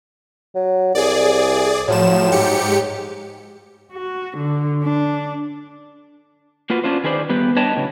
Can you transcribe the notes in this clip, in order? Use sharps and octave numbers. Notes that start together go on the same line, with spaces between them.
F#3
C2 G#4 D5
A2 F3 F#3 E7
G#2 G4 C#7
F#4
D3
D4
A#3 F4 F#4 B4
C#4 D4 F4 C5
D#3 G#4 B4 C5 D5
G3 B3 G4 B4
D4 B4 C#5 D#5 G5 A5
A2 C#3 F#3